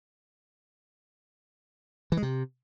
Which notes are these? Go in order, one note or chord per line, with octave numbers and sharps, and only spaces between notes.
E3
G#3
C3